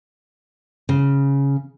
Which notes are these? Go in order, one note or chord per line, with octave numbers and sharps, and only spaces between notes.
C#3